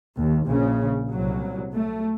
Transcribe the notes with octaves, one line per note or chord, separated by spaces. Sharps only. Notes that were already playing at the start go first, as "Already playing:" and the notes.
D#2
A#1 C#3
C2 F#3
A3